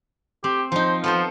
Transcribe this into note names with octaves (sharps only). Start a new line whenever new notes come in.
C4 G4
F3 D#4 C5
F3 B3 A4 C5